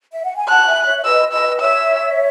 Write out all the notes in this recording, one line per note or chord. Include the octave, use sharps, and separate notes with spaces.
E5
F#5
G#5
F#5 A5 F#6
E5 G#5
C#5 E5
E5
B4 D#5 E6
B4 D#5 E6
D#5
C#5 E5 E6